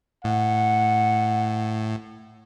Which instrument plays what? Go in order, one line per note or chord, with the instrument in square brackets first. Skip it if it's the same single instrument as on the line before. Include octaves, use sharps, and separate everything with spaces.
[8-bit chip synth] A2 [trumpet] F#5